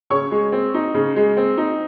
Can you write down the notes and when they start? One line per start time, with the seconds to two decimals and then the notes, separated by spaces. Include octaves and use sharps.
0.10 C#3 C#5 C#6
0.31 G#3
0.52 C4
0.74 D#4
0.94 C#3
1.16 G#3
1.37 C4
1.58 D#4